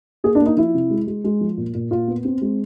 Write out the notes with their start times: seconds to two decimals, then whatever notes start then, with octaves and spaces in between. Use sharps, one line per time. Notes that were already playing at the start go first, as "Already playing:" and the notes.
0.24 A#3 G#4
0.35 D4
0.40 A#3
0.46 D#4
0.57 F3 E4
0.74 C3
0.90 G#3
1.07 G#3
1.24 G#3
1.41 F3
1.57 A#2
1.74 A#2
1.91 A#2 F4
2.08 B3
2.25 C4
2.42 G#3